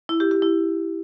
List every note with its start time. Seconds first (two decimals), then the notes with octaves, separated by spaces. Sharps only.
0.09 E4
0.20 G4
0.31 G4
0.42 E4